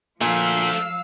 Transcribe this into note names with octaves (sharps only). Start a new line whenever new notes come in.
A#2 F3 A3 D4 F5 E6